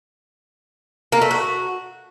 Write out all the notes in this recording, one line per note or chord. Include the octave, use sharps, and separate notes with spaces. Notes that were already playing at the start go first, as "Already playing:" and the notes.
A#3
A3
F#4